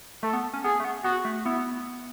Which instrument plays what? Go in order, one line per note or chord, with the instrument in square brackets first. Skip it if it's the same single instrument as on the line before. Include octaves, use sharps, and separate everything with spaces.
[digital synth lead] A3 [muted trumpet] A4
[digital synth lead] B3
C#4
[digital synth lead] B3 [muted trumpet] G#4
[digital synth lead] A3
B3
[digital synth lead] B3 [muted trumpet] F#4
[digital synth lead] A3
[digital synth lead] B3 [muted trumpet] E4